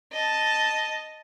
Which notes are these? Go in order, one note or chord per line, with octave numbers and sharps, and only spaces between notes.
D#5 A5